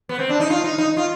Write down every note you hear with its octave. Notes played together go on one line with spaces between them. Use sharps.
B3
C4
D4
D#4
F4
D#4
D#4
F4